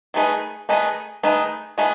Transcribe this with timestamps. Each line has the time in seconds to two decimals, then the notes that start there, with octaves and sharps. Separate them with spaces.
0.14 D#3 A3 D#4 G#4 B4
0.69 D#3 A3 D#4 G#4 B4
1.23 D#3 A3 D#4 G#4 B4
1.78 D#3 A3 D#4 G#4 B4